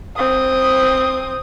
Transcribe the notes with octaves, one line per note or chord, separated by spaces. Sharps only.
C4 D#6